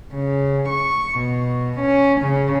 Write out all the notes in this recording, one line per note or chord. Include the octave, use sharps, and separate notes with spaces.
C#3
C#6
B2
C#4
C#3